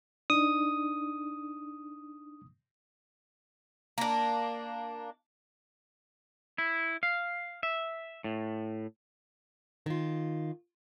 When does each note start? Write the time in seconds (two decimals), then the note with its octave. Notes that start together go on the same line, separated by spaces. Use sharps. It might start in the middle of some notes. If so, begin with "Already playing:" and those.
0.30 D4 D#4 D#6
3.98 A#3 D4
6.58 E4
7.03 F5
7.63 E5
8.24 A2
9.86 D#3 F4